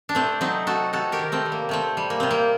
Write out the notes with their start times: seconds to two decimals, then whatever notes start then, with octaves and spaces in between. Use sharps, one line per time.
0.09 D4
0.15 C3 A3 C4
0.41 F#3 C4 D#4
0.67 A3 F#4 A4
0.93 C3 F#4 A4
1.12 G4 A#4
1.19 D#3
1.32 A3 C4
1.45 G3
1.52 A#3
1.69 C3 A3 C4
1.97 G3
2.10 A#3
2.20 C3 C4
2.31 A#3